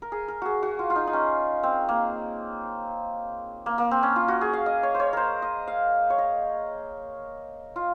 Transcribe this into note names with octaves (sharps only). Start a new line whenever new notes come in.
A#4
G#4
A#4
F#4 G#4
F#4
F4
F4
D#4
D#4
C#4
C4
A#3
A#3
A#3
C4
C#4
F4
F#4
G#4
F5
D#5
C#5
C5
C#5
A#4 C5
D#5
F5
C#5
D#5
F4